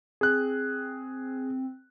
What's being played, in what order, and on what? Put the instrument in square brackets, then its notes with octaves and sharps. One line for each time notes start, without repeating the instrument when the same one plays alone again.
[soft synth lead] C4 [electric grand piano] G#4 F#6